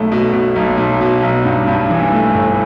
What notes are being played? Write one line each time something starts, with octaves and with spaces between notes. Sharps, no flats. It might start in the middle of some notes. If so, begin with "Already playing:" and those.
Already playing: B1 A3
B2
B2
B1
B1
B2
B1
G2
G2
E3
A3
G1